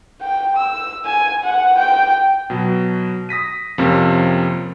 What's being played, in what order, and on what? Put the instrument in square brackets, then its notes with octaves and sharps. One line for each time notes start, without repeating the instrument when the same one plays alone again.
[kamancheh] G5
E6
G#5
F#5
G5
[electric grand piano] B2 F#3
D#6 A#6 B6 D#7
F2 C3 F3 A#3 C4 C#4